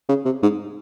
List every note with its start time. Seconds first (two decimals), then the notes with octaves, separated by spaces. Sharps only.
0.09 C#3
0.25 C3
0.43 G#2